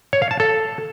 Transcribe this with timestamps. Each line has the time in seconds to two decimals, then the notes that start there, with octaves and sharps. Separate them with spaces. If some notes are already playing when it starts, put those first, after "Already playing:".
0.13 C#5
0.22 F5
0.31 A5
0.40 A4